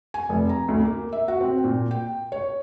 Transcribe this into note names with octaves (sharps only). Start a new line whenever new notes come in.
G#5
F1
A#5
D2
A#3
E5
F#4
C4
A#2
G5
C#5